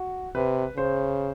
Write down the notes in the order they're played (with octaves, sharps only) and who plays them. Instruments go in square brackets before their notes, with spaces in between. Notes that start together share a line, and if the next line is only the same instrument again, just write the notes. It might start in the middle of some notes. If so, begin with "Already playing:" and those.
Already playing: [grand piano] F#4
[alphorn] C3 [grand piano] B4
[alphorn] C#3 [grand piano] C5